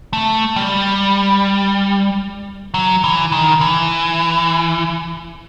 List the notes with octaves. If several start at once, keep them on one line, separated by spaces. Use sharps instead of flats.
A3
G3
F#3
E3
D#3
E3